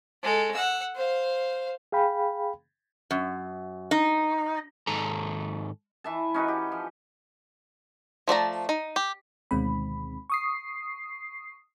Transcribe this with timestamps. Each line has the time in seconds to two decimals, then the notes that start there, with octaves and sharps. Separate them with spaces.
0.23 G#3 A4
0.54 F#5 E6
0.95 C5 F5
1.92 G#4 F5 G5 B5
3.11 F#2
3.91 D#4
4.87 G#2 D#3 A4 A#5
6.04 E3 E5 A5
6.34 C#4 D#4 F#4 B4
6.48 G4
6.72 F3
8.28 F3 A3 D5 A#5
8.69 D#4
8.96 G4
9.51 D2 B2 D#3 G#3 C4 B5
10.30 C#6 D#6 C7